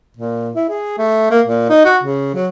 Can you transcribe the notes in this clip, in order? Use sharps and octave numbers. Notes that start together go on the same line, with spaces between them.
A#2
E4
G#4
A3
A#3
A#2
D#4
F#4
C#3
F#3